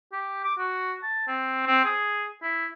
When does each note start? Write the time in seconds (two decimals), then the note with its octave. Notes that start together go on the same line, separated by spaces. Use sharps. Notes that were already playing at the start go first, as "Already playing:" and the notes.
0.13 G4
0.44 D6
0.58 F#4
1.03 A5
1.28 C4
1.67 C4
1.85 G#4
2.43 E4